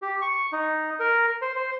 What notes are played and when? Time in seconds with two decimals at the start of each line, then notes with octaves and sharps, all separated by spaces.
0.02 G4
0.22 C#6
0.52 D#4
1.00 A#4
1.42 C5
1.56 C5